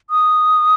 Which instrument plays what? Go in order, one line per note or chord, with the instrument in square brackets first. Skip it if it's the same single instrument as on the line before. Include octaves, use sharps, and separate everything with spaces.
[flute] D#6